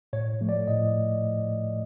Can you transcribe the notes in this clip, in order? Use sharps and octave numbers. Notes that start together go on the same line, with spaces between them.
A2 C#5
F3 A3
D5
A2 D#5